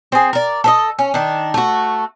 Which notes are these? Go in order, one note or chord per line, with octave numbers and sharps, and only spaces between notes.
C4 G#4
A#4 D5
A4 B4 D#5
C#4
D#3 D4
A3 F#4